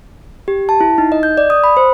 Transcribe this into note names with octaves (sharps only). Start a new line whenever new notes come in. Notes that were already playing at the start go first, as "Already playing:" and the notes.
G4
A5
E4
D#4
D#5
G6
D5
D#6
B5
C5